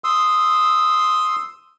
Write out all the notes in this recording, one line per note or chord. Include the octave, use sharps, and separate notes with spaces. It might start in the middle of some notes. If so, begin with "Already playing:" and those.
C6 D#6 E6